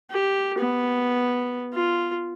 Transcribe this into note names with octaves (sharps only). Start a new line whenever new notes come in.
G4
B3
F4